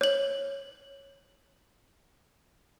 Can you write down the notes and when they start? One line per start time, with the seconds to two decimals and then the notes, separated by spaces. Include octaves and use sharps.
0.01 C#5 F#7